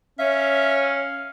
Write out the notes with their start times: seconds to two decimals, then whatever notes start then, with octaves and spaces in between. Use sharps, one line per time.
0.19 C#4 C#5 E5 F5